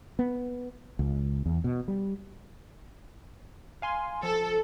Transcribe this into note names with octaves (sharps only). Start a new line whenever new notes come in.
B3
C#2
E2
B2
G3
F5 G#5 C6
F3 A4